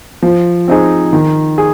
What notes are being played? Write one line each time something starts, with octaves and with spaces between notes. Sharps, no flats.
F3
C4 D#4 G#4
D#3
G#4